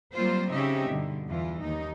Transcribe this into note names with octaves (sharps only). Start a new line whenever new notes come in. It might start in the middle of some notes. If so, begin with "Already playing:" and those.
F#3 G3 A#3 C4 F4 C5
C#3 C4 C#4 D#4 G4 E5
G2 B2 D3
E2 E3 F4
D#2 D#4